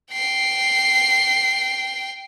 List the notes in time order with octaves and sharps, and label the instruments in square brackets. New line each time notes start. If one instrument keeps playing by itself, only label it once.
[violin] G5 C7